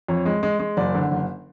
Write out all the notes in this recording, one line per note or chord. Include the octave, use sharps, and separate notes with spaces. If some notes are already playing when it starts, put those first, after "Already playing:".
F2 C#5
G#3
G#3
G#3
F#1 D5
D3
F#1